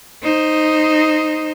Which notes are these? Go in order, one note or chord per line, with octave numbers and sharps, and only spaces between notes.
D#4 C5